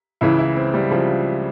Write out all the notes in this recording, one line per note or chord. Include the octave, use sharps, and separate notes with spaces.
C#2 C#3 E3 E4
E4
C4
G3
C#3 F3